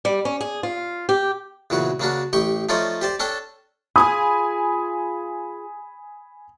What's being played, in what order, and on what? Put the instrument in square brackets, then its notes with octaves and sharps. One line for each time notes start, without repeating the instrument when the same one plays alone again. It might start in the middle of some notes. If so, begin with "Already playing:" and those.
[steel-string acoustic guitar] G3
C#4
G#4
F4
G4
[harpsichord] E2 A#2 C#3 F#4
C#3 A#3 D4 F#4
A1 G4 G5 C#6
F3 A3 D#4 F4 C#5 D5
G4 C5 D5
C#4 D4 A4 G5
[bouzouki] F4 G4 G#4 [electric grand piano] G#5 B5 [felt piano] D#6